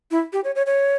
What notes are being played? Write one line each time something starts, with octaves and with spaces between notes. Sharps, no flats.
E4
G4
C#5
C#5
C#5